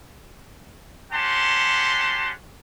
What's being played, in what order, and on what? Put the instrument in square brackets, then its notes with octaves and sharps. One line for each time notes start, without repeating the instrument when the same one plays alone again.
[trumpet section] C#4 G4 F#5 A5 C6